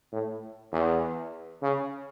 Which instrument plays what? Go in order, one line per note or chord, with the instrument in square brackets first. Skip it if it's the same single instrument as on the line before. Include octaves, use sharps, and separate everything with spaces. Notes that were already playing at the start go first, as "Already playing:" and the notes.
[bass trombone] A2
E2
C#3